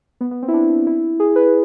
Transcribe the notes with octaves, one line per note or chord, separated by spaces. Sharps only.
B3
B3
C4
E4
D4
E4
G#4
B4